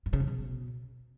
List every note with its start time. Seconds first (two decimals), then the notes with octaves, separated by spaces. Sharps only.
0.06 G2
0.13 C#3
0.20 F#2
0.27 B2